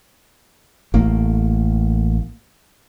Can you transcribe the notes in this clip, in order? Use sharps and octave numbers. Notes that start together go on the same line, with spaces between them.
A1 A3 A#3